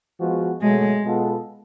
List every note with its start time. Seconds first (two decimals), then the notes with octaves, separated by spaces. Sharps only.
0.20 F3 G#3 B3 F#4
0.61 B2 F#3 G#3 A3
1.02 B2 G#3 B3 F4 A4